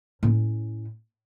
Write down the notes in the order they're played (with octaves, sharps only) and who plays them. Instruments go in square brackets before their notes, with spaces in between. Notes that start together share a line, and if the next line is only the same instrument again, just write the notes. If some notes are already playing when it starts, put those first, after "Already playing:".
[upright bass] A2 C#4